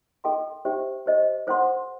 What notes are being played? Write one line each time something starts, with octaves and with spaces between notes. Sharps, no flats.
A4 D#5 G5 C6
G4 C5 E5 G5
G4 C5 D#5
A4 C5 F#5 C6